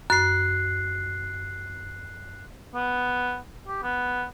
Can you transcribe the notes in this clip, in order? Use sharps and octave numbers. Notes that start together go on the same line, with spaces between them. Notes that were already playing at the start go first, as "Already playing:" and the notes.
F#2 F#6 C7
B3
G4
B3